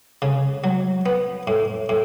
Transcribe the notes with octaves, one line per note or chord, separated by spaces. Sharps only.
C#3
F#3
B3
A2
A2